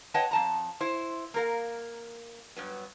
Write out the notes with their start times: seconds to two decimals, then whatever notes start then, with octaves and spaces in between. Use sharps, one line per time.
0.14 B4 C#5 D#5 F#5 G5 A5
0.31 F2 A5 A#5
0.80 E4 C5
1.34 A#3 A#4 F5
2.56 G2 F#3 B3